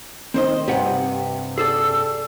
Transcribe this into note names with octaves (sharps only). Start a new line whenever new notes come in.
D#3 C4 C5 D#5
G2 C3 G4 B4 F#5
G#4 A4 D5 E6